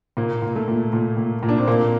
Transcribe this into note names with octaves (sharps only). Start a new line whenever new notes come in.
A#2 A#3
A#2
A3
A#2
A#2
A#2
A#2
D4
C4
A#2 A#3